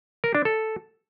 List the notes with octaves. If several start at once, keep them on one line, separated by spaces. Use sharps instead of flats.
A#4
D4
A4